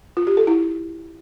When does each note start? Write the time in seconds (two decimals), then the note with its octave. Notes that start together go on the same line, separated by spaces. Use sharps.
0.17 F4
0.27 G4
0.37 A4
0.47 E4